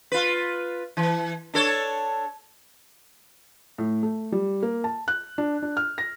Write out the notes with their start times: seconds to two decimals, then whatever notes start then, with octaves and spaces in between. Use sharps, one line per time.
0.12 F4 B4
0.97 E3
1.54 D4 A4 C#5
3.78 A2
4.03 A3
4.32 G3
4.63 A#3
4.84 A5
5.08 F#6
5.38 D4
5.62 D4
5.77 F6
5.98 A#6